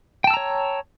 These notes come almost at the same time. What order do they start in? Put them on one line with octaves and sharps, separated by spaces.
G5 A5 E6 A#5 C#5